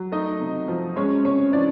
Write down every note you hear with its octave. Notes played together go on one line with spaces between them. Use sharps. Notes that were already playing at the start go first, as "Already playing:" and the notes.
Already playing: F#3
A3 D#4 D#5
C3
F3
G#3 C#4 C#5
C3 C#4 C#5
E3 D4 D5